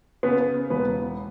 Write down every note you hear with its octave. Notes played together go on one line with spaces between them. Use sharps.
C#3 B3 B4
E1 B3 B4